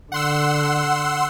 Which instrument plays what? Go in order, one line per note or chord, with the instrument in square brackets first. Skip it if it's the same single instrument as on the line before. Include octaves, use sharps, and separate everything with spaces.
[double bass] D3 [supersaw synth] F#5 C6 E6